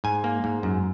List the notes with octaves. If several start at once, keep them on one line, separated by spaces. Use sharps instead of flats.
G#2 G#5
A#3
G#2
F#2